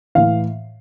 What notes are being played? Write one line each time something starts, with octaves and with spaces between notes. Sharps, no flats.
A2 E3 F5